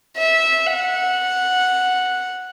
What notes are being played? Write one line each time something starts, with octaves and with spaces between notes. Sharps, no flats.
E5
F#5